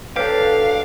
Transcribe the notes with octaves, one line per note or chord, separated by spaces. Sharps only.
F#3 D4 G4 A4 B4 C#5 F5 G5